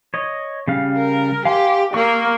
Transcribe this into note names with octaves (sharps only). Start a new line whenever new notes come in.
C#5 D#5
C#3 G3 F5
A#4
G4 F5 G#5 C6
A#3 C#6 E6